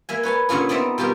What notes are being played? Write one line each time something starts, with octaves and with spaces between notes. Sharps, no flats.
A#3 E5 G#5
B4 C#5 G#5 A5
A#2 D3 C#4 F4 G#4
B3 C4 D#4 D5 E5
B2 G3 F4 G4 A#4